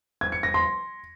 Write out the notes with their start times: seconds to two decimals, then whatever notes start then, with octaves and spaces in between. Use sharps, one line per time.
0.21 G#6
0.32 C#7
0.43 A#6
0.54 C6